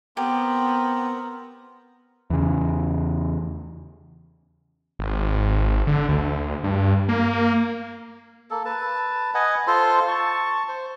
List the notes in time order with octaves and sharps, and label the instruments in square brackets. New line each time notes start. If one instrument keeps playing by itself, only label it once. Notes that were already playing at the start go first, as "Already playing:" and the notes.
[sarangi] B3 [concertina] C4 A#4 [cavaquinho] G4
[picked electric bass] E2 C#3
[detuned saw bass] G#1
D3
D2
G2
A#3
[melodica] A#3 A4
B4 A5
B4 D#5 F#5 G#5
F4 A4 C5 C6
A5 C#6
C5